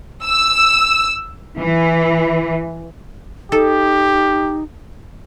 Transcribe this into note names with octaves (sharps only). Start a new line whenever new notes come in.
E6
E3
D#4 G4 A4